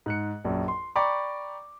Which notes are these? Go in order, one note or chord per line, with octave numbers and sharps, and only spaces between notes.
G#2 F#6 C#7
A#1 F#2
C6
D5 G5 A#5 B5 C#6 D6